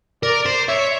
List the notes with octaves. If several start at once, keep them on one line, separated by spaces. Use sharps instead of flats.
A#4 D5
C5
C#5 E5